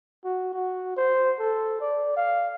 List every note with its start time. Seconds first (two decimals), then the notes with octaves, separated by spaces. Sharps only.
0.25 F#4
0.54 F#4
0.97 C5
1.39 A4
1.81 D5
2.17 F5